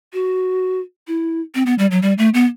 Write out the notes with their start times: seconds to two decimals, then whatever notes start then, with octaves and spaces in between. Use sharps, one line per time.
0.13 F#4
1.08 E4
1.55 C4
1.66 B3
1.79 G3
1.91 F#3
2.02 G3
2.18 A3
2.34 B3